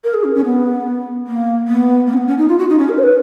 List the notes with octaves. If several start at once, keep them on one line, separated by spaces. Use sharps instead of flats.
A#4
G#4
C#4
C#4
B3
A#3
B3
A#3
C#4
B3
C#4
D#4
F4
F#4
D#4
C#4
A#4
C#5
B4